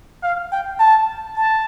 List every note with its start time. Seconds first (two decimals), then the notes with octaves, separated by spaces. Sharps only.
0.23 F5
0.52 G5
0.80 A5
1.37 A5